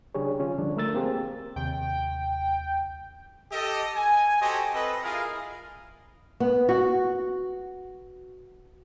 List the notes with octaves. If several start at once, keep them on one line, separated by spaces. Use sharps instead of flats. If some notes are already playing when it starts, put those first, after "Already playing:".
C#3 F#3 D4 G4 G#4 C#5
D3 C#4 F4
D3 F3 G3 D4
A3 A#4 E6 A6
A#3 C4 G4 G#4 A#4
D#2 C3 G5
G4 A4 D#5
G#5
F#4 G4 A4 C5 D#5
C4 A4 B4 D#5
E4 F4 G#4 A#4 D#5 F5
B3
F#4